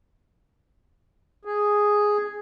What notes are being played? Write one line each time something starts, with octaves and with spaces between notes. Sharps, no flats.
G#4